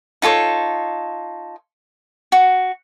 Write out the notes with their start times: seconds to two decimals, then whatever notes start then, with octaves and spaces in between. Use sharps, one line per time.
0.22 D#4 F4 A4 C#5
2.32 F#4